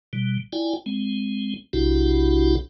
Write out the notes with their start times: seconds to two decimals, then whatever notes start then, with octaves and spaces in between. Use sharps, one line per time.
0.13 B2 G3
0.53 E4 F4 D5 G5 G#5
0.86 G#3 C4
1.73 B1 C3 D4 E4 F#4 G4